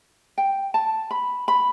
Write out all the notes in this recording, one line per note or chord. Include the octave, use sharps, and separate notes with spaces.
G5
A5
B5
B5